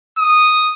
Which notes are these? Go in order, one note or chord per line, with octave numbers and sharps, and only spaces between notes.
D#6